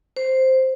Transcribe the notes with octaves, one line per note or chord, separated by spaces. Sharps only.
C5